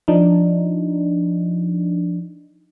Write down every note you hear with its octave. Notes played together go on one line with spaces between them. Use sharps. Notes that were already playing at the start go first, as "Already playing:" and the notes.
F3 D4 D#4